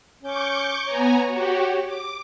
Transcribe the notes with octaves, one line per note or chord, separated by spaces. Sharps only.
C#4 C#6 D6 G6
B3 C#5 G#5 A#5
F#4 G4
D6